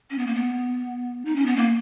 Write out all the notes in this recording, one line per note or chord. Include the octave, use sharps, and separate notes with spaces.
C#4
B3
A#3
B3
D#4
C#4
B3
A#3